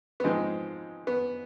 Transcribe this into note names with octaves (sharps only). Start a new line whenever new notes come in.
B3
G#2 F3 G#3 C4
B3